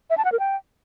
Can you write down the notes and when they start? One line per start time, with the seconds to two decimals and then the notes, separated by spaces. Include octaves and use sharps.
0.10 E5
0.18 A5
0.25 F#5
0.32 A#4
0.40 G5